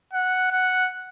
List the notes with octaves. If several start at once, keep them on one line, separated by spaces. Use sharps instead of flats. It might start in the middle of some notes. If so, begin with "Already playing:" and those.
F#5
F#5